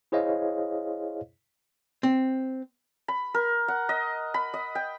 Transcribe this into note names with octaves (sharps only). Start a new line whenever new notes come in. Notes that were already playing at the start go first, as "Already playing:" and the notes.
E4 G#4 C5 C#5 D#5 F5
C4
B5
A#4
F#5
D#5
B5
D#5
G5